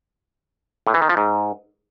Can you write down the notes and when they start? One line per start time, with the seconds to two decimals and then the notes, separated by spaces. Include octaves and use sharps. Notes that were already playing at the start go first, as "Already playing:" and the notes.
0.87 A2
0.94 E3
1.02 D#3
1.09 F3
1.17 G#2